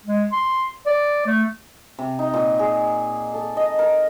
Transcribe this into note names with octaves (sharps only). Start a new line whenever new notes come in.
G#3
C6
D5
A3
C3
D#4
A#2
G#4
A4
D#5
A#4